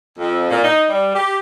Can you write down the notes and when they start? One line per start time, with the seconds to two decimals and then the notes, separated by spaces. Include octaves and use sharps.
0.18 F2
0.50 A#2
0.63 D#4
0.88 G3
1.14 G4